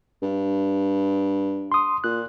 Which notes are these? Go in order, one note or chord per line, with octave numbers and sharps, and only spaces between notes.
G2
C6 D#6
A#2 F#6